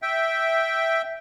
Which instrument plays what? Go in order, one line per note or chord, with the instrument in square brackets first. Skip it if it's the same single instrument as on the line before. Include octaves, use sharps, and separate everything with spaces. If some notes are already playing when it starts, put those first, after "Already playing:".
[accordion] E5 G5